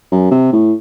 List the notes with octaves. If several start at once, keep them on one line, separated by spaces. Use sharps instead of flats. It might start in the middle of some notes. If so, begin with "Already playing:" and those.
F#2
C3
A2